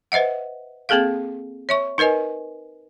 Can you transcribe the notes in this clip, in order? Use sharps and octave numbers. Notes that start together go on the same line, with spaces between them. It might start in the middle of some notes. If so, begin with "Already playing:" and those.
B4 C5 D#5 E5 F#5
A#3 C4 G#4 A4 F5
C#5 E5 C#6
D#4 A#4 B4 D#5 G#5